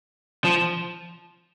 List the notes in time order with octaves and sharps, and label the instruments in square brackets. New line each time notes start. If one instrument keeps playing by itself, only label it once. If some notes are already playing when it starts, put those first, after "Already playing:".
[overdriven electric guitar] F3